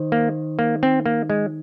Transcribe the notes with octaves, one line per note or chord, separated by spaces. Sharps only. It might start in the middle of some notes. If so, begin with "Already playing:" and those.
Already playing: D#3 D#4 C5
A#3
A#3
C4
A#3
G#3